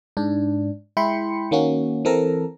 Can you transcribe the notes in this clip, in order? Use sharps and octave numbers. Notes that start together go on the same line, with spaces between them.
G#2 D4
G#3 E4 G5 B5 C6 C#7
D#3 A#3 C#4 F#4
E3 C4 A4 A#4 A#5